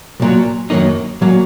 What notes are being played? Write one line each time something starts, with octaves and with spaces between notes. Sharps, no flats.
B1 A#2 F#3
F#2 D#3 F#3 A#3 D#4
A#2 F#3 A#3